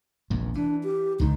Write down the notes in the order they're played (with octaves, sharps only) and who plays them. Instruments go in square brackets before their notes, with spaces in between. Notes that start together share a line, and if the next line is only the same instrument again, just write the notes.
[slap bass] F1 A#1 E2
[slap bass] E3 [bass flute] D4
[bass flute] G4
[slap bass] C#2 D3 D#3 [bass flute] D#4